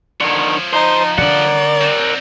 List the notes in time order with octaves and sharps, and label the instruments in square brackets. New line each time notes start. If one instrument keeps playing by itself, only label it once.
[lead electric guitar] D3 D#3 [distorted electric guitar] F3 C#5
[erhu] D#4 [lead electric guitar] C5
[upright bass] D3 [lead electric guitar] A#4 F#5 [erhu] D5
[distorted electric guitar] C4 D#4